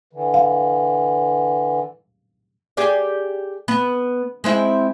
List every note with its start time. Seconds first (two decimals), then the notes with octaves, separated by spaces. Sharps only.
0.13 D3 E3
0.34 F5
2.77 G4 G#4 D5
3.68 B3
4.44 G#3 C4 E4